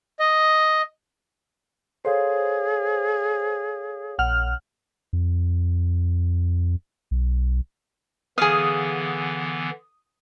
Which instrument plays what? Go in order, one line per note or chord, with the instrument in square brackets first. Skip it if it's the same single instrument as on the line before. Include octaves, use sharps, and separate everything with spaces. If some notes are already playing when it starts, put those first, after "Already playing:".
[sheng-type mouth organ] D#5
[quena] G#4 [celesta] A4 C#5 F5 [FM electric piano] C5
[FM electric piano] A#1 F#5 F6
[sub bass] F2
B1
[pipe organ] D3 E3 B3 [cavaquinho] G#4 F5 [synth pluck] D#6